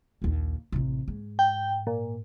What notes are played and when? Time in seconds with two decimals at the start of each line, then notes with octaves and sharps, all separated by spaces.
0.22 A#1 D#2
0.72 A1 C3
1.08 G#2
1.39 G5
1.87 A#2